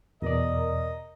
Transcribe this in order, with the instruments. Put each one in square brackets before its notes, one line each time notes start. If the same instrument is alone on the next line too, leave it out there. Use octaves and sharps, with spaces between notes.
[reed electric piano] E2 B2 D5 [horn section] A#4 D#5